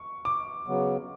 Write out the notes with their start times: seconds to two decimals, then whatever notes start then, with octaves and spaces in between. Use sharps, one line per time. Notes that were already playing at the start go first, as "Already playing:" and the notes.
Already playing: C#6
0.25 D6
0.67 C#3 F#3 B3